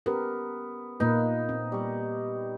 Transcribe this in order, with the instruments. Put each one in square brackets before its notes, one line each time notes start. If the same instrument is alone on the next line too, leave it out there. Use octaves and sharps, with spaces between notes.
[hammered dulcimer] B3 [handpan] C#4 G4 A#4
[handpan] A#2 A#3 B4 [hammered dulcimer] D#4
[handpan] C4
[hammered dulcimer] G3 C#6